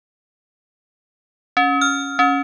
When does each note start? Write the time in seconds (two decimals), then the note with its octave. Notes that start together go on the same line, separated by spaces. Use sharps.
1.57 C#4
1.81 F6
2.19 C#4